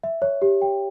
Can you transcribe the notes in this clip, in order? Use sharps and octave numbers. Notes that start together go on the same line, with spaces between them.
E5
C#5
G4
G5